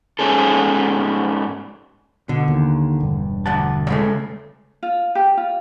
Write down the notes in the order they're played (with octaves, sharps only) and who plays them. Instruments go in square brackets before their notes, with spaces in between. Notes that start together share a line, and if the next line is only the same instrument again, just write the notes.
[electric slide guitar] G#2 C#4 G#4 A4
[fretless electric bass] B2 [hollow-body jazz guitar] D3
[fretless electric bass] D#2
E1 G2
[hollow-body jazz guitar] D2 F#5 A5
C#3 G#3 A3
[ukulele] F4
G4
F4